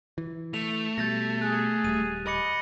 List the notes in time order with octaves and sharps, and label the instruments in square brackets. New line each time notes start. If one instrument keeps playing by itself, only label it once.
[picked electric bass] E3
[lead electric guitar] A3 [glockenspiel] F7
[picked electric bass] B2 G3 [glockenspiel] G6 A6 A#6
[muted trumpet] G#4 [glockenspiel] F#6
[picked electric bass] D#1 G3 [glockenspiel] D#7
[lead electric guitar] D#5 [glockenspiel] B5 D6 C#7